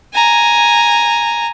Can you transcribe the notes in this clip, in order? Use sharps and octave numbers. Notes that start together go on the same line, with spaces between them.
G#5 A#5